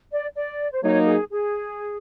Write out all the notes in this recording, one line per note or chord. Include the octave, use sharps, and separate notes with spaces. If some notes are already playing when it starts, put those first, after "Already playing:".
D5
D5
C5
F#3 A#3 D#4 C#5
G#4
G#4